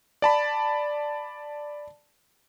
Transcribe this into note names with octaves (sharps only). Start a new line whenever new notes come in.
D5 A5 B5